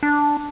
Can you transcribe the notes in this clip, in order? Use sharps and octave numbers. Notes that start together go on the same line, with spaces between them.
D4